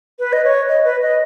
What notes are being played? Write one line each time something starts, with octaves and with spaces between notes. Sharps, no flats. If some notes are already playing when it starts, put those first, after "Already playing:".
B4
D#5
C#5
D#5
B4
D#5